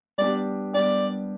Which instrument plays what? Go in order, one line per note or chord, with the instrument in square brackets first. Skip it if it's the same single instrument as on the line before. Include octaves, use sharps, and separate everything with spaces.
[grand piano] G3 B3 D4 G4 [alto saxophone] D5
[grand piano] G3 B3 D4 G4 [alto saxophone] D5